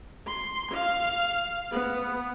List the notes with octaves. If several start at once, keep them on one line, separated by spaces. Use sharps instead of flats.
C6
F5
B3